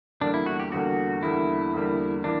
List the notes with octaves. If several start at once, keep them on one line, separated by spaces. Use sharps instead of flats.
E2 D3 G3 A#3 D4
E4
F#4
G4
E2 D3 G3 A#3 F#4
E2 D3 G3 A#3 E4
E2 D3 G3 A#3
E3 A#3 D4